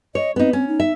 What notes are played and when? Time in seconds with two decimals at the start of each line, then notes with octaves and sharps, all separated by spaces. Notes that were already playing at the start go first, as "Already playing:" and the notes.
0.15 C#5 D#5
0.36 B3 C4 D#4
0.53 C4 C#4
0.68 D#4
0.80 E5